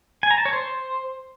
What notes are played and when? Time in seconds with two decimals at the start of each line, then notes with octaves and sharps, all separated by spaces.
0.23 G#5
0.31 A#5
0.38 A5
0.45 C#5
0.53 C5